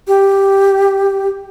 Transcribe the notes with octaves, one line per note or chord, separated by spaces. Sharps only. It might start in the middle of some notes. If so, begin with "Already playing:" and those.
G4